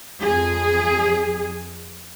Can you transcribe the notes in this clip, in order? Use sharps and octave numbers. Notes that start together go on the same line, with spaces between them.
F2 G#4